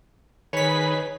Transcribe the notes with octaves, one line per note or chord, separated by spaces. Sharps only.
D#3 G#4 B4 C#5 B6